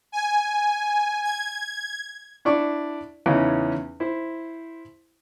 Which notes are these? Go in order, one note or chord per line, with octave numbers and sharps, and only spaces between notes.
G#5
G#6
D4 E4 D5 C#6
E2 C#3 E3 C#4 D#4
E4 C5